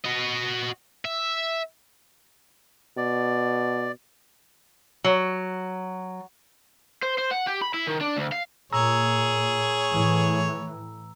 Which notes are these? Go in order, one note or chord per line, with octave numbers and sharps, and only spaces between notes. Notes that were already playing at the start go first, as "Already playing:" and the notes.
F#4 D#5
E5
B2 D5
F#3
C5
C5
F#5
G4
B5
E4
D#3
D4
D2
F5
A#2 G#4 C#5 A#5 E6 A#6
A2 E3